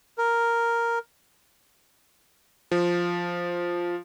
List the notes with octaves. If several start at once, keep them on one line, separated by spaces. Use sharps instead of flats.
A#4
F3